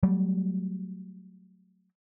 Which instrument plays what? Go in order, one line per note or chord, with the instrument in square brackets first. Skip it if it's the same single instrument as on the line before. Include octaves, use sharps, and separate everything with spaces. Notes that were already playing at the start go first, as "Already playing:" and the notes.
[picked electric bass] F#3 G3 A3